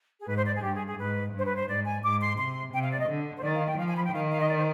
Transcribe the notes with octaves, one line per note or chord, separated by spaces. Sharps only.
G#4
G#2 B4
C5
D5
G#4
G2 G4
G#4
G#4
G#2 B4
G2 C5
B4
C5
G#2 D5
G#5
G#2 D6
C6
C3 C6
C3 G5
F5
D5
D#5
D3
C5
D#3 D5
F5
G5
F3 F5
G#5
B5
G5
D#3 F5
F5
D#5
D5
C5